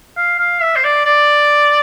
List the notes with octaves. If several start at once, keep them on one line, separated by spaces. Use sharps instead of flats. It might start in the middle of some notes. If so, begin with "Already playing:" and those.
F5
F5
E5
C5
D5
D5